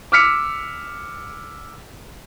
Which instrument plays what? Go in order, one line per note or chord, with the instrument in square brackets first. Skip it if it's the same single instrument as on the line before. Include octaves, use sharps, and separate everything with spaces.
[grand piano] D6 E6 F6 B6 C#7